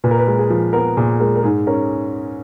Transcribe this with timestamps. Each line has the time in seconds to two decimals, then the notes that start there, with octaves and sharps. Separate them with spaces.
0.04 A#2 B4
0.11 A#4
0.19 B4
0.27 G#3
0.39 G#4
0.50 F3
0.73 B3 A#4
0.96 A#2 G#4
1.20 G#3 A#4
1.36 A#4
1.43 G#2 G#4
1.67 C#4 A#4